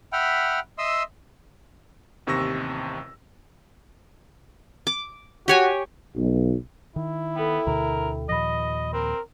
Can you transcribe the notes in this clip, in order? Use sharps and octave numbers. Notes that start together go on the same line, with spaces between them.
E5 F#5 G5 B5 F6
D#5 E5 C6 D#6 E6
A1 D#2 C3 C#6 E6 A#6
D6
F#4 G4 C#5 G#5
B1
D#3 E4
B3 A4 G5
D2 B2 D3 A#4
D#2 A#2 F3 D#5 B5 A#6
C4 A#4